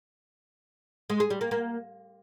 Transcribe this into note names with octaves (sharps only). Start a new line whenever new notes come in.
G#3
G#4
G3
A#3
A#3